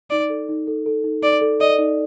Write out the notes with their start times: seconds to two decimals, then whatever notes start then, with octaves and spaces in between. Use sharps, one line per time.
0.10 D#4 D5
0.30 A4
0.49 D#4
0.67 A4
0.86 A4
1.04 D#4
1.23 D#4 D5
1.41 A4
1.61 D5 D#5
1.79 D#4